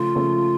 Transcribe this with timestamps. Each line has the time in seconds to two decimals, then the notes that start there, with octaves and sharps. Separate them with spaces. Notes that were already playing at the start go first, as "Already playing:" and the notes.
Already playing: C#3 F3 A3 F4
0.15 C#3 F3 A3